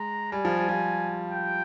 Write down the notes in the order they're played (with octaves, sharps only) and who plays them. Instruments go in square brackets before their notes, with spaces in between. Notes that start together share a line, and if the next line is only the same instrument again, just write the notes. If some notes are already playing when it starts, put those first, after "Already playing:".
Already playing: [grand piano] G#3 [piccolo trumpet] A#5
[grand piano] G3 [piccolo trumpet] G#5
[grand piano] F3
G3
F3
[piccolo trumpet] G5